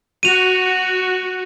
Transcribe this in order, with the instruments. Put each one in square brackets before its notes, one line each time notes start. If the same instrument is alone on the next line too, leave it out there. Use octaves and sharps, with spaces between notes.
[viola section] F#4 [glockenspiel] D#7 F7